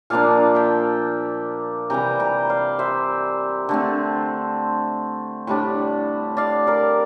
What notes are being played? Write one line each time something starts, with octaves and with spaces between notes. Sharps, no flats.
A#2 F3 A#3 D4 D5 F5
E5 G5
C3 E3 G3 G5 A#5
G5 A#5
D5 F5
C5 E5
D3 A3 C4
A2 G3 D4
D5 F5
A#4 D5